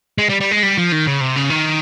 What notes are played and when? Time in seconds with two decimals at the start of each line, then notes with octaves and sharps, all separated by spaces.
0.18 G#3
0.29 G3
0.41 G3
0.51 G#3
0.63 G3
0.77 F3
0.92 D#3
1.07 C#3
1.21 C3
1.36 C#3
1.50 D#3